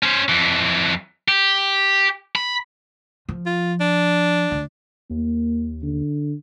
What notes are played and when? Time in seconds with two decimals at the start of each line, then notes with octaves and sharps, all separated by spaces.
0.03 C#4 C5
0.29 F2 E3
1.28 G4
2.35 B5
3.29 F3
3.46 F4
3.80 D4
4.52 D2
5.10 D#2 A#3
5.83 D3